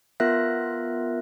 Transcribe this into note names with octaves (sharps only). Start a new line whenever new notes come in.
B3 F4 A#4 E5 F#6 A#6